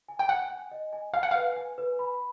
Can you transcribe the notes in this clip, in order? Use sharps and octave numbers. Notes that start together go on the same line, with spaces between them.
G#5
G5
F#5 G#5
G#5
D#5
G#5
F5 G#5
F#5
B4 F5
G#5
B4
B5